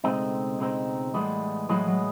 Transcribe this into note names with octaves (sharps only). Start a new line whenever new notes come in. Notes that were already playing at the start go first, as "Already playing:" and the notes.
C#2 B2 G#3 A3 C4 D#4
C#2 B2 G#3 C4 D#4
A2 E3 G3 G#3 B3
A2 E3 F#3 G#3 B3
F#3